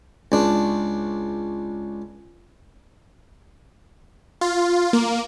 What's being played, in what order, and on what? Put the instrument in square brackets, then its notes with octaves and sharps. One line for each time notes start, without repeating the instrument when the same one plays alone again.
[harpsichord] C#2 D4
[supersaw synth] F4
A#3